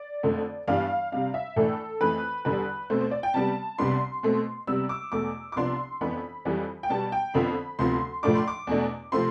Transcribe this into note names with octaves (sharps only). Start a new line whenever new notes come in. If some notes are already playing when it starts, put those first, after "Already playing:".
Already playing: D5
F2 D3 A3
G2 E3 G3 B3 D4 F5
C3 G3 D4 F5
E5
A2 E3 A3 D4 A4
F2 E3 A3 B4
E2 D3 G3 B4
B2 A3 C4 C5
C5
D5
G5
C3 G3 B3 A5
C2 C3 G3 B3 D4 C6
B2 A3 C4
C3 G3 B3 E6
D6
E2 B2 A3 D6
D6
C2 C3 F3 B3 D4 C6
F2 E3 B3 D4 B5
F2 E3 G3
G5
B2 G3 B3 A5
G5
F2 D3 F3 B3 B5
D2 C3 F3 B3 C6
A2 F3 A3 D4 D6
C6
D6
E2 B2 A3 D4
C3 F3 A3 C4 C6